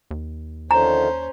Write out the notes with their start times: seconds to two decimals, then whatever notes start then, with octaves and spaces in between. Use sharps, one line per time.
0.11 D#2
0.71 D3 D#3 F3 C#4 C5 A#5